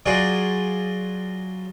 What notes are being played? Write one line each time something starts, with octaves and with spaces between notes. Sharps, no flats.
F#3 F4 F#4 G#4 D5